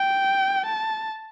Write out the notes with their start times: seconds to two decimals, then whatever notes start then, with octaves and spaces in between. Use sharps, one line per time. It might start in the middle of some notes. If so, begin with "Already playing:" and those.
Already playing: G5
0.66 A5